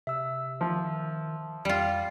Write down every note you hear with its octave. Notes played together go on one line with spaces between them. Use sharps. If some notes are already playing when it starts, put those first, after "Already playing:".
C3 E5 E6
D#3 F3
F2 G3 F4